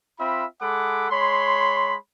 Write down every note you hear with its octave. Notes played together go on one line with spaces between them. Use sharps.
C4 F4 E5 B5
G#3 A4 F#5 B5 D6
G#3 C#5 B5 C6